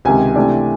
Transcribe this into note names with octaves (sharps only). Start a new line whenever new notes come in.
C#2 C3 D#3 G#5
C3 E3 A3 D4